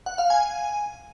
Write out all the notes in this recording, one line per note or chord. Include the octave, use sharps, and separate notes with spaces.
F#5
F5
G#5